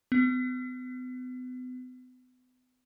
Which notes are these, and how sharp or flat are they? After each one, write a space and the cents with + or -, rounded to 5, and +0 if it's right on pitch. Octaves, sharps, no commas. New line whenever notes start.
B3 +40